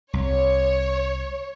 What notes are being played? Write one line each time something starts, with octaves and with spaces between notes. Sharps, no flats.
C2 C#5